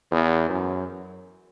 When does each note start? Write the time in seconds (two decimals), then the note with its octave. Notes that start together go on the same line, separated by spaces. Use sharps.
0.11 E2
0.50 F#2